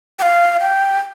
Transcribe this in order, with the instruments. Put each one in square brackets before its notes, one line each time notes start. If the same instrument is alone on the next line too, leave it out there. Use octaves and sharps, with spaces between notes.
[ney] G5
F5
G5